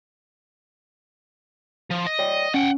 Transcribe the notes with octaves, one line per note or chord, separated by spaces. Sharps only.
F3
D#5
C#5 D5 G5
C#4 F#5 G5